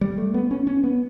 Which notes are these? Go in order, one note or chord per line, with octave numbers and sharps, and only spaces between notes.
G3
A3
B3
C#4
C#4
B3